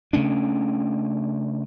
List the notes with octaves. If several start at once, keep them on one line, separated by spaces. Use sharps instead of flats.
C#3 A3 C#4 D4